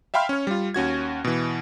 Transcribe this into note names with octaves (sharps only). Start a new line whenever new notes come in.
E5 F5 G5 B5 C6 F6
C#4 C#5
G3 F4
D#2 C#4 F#4 G#6
B2 E3